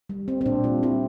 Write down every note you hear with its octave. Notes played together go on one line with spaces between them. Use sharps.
G3
C4
C4
A#2 D4
G3 F4
C4 E4